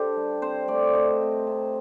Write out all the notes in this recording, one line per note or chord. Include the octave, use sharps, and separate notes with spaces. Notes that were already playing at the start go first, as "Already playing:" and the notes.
Already playing: D4 G4 A4 C5 D5
G3
C4 C5
A3 D5
C4 D#5
C4
C3